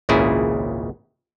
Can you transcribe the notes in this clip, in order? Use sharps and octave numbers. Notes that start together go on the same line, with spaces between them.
G#1 C#2 A#2 C#3 E4 G#4